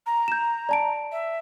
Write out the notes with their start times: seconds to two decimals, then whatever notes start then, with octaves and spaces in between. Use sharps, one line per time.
0.06 A#5
0.28 G6 E7
0.69 D5 A5 D7
1.12 E5